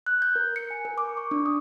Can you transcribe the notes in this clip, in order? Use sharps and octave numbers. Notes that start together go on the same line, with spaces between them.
F#6
G6
A#4
C#7
G#5
A#4
D6
C#6
D4
D#6